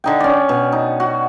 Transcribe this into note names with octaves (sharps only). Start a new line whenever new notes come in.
D3 D#4 G5
C#4 D5
B2
D#4
F#4